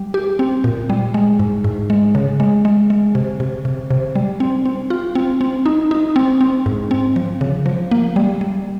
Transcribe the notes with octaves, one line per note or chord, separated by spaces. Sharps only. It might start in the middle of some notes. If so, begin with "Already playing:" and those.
Already playing: G3
G4
C4
A#2
G3
G#3
G#2
G#2
G#3
C#3
G#3
G#3
G#3
C3
C3
C3
C3
G3
C4
C4
F4
C4
C4
D#4
D#4
C4
C4
G#2
C4
F3
C#3
F3
A#3
G3
G3